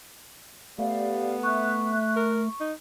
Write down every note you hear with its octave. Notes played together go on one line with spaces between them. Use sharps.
A3 B3 G4 D5 F5
E5 C#6 F#6
A#4
D#4